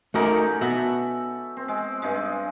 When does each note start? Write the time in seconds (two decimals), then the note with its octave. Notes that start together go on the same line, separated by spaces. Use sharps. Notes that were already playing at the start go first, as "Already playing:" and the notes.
0.14 A3 C#4 D#4 F#4 A#4 D6
0.61 B3 F#4 A4 E5
1.57 C4
1.68 G#3
2.02 G2 G#3